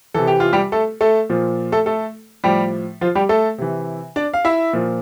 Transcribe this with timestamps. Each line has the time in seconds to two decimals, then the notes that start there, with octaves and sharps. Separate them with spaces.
0.14 C3 E3 A4
0.27 G4
0.40 F4
0.53 G3 G4
0.72 A3 A4
1.01 A3 A4
1.30 A#2 F3
1.72 A3 A4
1.86 A3 A4
2.44 A2 F3 G3 G4
3.01 F3 F4
3.15 G3 G4
3.29 A3 A4
3.58 C3 E3
4.16 D4 D5
4.34 F5
4.45 E4 E5
4.73 A#2 F3